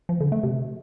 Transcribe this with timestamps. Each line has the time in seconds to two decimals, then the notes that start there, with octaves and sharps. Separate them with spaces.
0.09 F3
0.20 D3
0.32 A3
0.43 C3